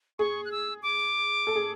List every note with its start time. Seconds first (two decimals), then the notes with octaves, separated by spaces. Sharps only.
0.19 G#4 C#6
0.45 F#6
0.52 E6
0.83 D6
1.47 A4
1.56 G#4